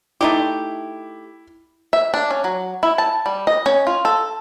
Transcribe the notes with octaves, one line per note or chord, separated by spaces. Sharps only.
A3 D#4 E4 G4
E5
D4
C#4
F#3
E4
A5
G3
D#5
C#4
F4
A4